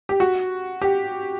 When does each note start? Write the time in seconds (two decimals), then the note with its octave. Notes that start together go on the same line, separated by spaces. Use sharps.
0.09 G4
0.20 F#4
0.82 G4